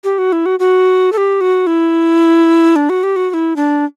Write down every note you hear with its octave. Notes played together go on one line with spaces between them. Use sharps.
G4
F#4
E4
F#4
F#4
A4
G4
F#4
E4
D4
F#4
G4
F#4
F#4
E4
D4